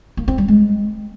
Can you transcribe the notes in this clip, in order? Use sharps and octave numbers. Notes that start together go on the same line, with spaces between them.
A#3
C4
G3
G#3